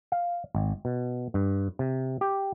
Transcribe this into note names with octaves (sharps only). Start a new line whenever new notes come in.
F5
G#1
B2
G2
C3
G4